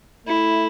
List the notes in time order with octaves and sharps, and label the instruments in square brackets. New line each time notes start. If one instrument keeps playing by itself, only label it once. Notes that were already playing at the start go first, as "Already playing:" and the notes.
[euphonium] A3 [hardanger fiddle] E4